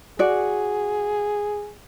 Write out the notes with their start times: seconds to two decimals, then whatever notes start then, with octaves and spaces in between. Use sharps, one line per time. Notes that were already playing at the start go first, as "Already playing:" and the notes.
0.19 F#4 G#4 D5